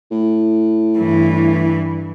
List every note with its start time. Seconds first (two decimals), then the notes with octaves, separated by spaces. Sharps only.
0.11 A2
0.97 G2 E3